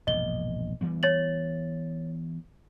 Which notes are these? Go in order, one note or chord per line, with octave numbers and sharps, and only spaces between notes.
E1 A#1 G2 D#5 G7
E3 G3 B3
C#5 A6 F#7